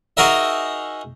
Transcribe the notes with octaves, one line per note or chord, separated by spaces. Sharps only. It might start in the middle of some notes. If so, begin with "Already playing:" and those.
D#4 F#4 G#4 A#4 E5